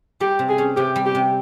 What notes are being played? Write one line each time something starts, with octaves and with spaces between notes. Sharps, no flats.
G3 G4
C3
G#4
C#4
C3 G4
G3
G4
C3